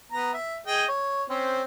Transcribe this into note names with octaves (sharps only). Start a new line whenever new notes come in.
B3 A#5
E5
G#4 D#5 G5
C#5
C4 C#4 C5